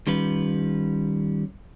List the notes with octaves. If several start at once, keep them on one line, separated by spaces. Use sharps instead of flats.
D#3 G3 C#4 F4 B4